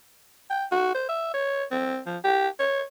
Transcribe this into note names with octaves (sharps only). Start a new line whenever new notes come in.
G5
F#4
C5
E5
C#5
C4
F3
G4
C#5